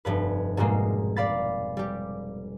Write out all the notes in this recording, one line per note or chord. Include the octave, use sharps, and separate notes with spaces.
F1 G2 B4
G#2 B2 G3 G#3 A#3
D5 F5 B5 A6
G3 G4